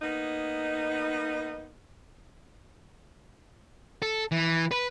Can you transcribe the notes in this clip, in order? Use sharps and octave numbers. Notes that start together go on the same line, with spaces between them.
A#3 B3 D#4
A4
E3
B4